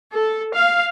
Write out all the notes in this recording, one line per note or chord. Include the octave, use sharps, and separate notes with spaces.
A4
F5